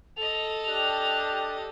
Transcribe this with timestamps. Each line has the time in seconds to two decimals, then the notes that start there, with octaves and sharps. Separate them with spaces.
0.17 A4 D#5 F7
0.66 D4 G4